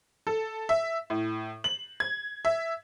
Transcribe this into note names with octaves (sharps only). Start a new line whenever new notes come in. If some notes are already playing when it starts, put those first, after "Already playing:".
A4
E5
A2
F#7
G#6
E5